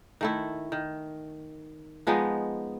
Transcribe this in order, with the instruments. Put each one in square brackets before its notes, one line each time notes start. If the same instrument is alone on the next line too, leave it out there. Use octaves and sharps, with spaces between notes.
[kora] D#3 A3 E4
D#3
F3 G#3 B3 D#4